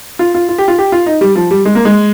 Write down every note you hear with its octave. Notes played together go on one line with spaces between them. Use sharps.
F4
F4
F4
G4
F4
G4
F4
D#4
G3
F3
G3
G#3
A#3
G#3